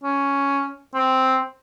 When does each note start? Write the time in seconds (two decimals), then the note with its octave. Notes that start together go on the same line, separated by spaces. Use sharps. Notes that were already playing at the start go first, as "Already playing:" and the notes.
0.03 C#4
0.94 C4